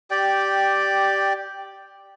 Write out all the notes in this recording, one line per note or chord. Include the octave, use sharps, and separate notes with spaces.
G4 D5 G5